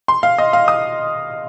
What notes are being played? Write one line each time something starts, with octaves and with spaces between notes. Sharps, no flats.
C6
F5
D#5
F5
D#6